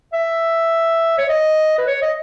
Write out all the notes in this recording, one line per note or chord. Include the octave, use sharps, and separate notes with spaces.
E5
C#5
D#5
B4
C#5
D#5